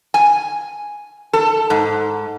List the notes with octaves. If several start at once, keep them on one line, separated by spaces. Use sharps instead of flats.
G#5
A4
G#2